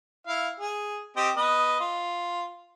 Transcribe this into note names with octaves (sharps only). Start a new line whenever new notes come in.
E4 F5
G#4
C4 G4 D#5
B3 B4 D#5
F4